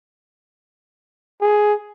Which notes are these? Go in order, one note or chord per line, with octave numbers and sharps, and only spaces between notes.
G#4